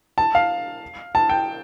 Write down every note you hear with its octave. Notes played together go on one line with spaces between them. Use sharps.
A5
F5
A5
G5